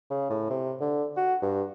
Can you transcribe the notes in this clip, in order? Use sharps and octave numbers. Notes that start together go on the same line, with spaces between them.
C#3
A2
C3
D3
F#4
G2